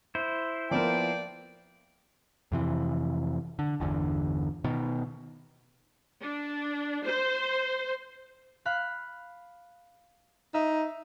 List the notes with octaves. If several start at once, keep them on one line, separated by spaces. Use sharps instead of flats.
E4 C5
F3 A#3 B3 A#4 D5 G5
F2 C3 E3
D3
G1 E2 D3
B2 D#3
D4
C5
F5 B5 F#6
D#4 E5